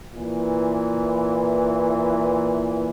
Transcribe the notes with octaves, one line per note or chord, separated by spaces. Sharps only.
A#2 E3